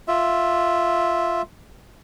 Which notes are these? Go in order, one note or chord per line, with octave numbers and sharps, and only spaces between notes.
F4 E5